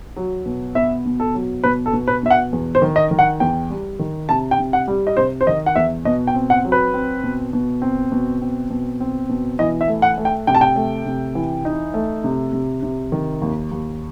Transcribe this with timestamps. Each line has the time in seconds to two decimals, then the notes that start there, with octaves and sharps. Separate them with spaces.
0.17 F#3
0.46 B2
0.75 B3 E5
1.05 B2
1.20 A4
1.35 F#3
1.64 B2 B4
1.86 A4
1.93 B2
2.08 B4
2.23 B2 E5
2.30 F#5
2.53 E2
2.75 C5
2.82 D#3
2.96 D#5
3.11 D#3
3.19 F#5
3.40 E2 G5
3.70 G3
3.99 D#3
4.29 C3 A5
4.51 G5
4.58 C3
4.73 F#5
4.88 G3
5.07 D#5
5.17 C3 C5
5.41 C5
5.47 D#3 D#5
5.66 F#5
5.76 E2 E5
6.05 B2 D#5
6.27 G5
6.35 C4
6.50 F#5
6.65 F#3
6.72 B4
6.94 C4
7.23 B2
7.53 B2
7.82 C4
8.12 B2
8.42 C4
8.70 B2
9.00 C4
9.29 B2
9.59 E3 D#5
9.81 E5
9.88 A3
10.02 F#5
10.18 A3
10.25 G5
10.47 C3 G5
10.55 A5
10.61 G5
10.76 A3
11.06 C3
11.35 E3
11.65 D#4
11.94 A3
12.24 C3
12.53 C3
12.83 C3
13.12 D#3
13.42 D#2
13.71 D#2